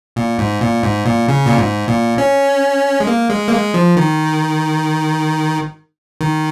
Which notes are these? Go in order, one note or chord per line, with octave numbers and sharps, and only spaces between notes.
A#2
G#2
A#2
G#2
A#2
C#3
A#2
G#2
A#2
C#4
G#3
A#3
G#3
A#3
G#3
F3
D#3
D#3